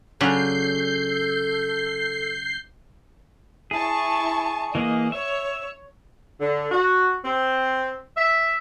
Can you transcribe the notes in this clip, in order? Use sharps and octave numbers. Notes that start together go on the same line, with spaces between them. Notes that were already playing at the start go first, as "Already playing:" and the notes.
C#3 F#3 D4 A4 G6 C7
E4 G#4 A5 C#6
E3 A#3 G#4 D#5
C#5 E5
D3
F#4
C4
E5